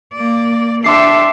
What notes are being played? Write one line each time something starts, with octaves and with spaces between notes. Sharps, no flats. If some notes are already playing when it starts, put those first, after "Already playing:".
A#3 D5
D4 G4 A4 E5 C6 D6 C7